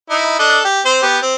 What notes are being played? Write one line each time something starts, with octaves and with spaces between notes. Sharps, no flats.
D#4 E4
D4 A4 D#5
G4
C4 C5
B3 G4
C4